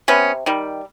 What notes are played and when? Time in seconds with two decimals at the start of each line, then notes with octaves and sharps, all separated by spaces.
0.08 C3 B3 C#4
0.46 D#3 G3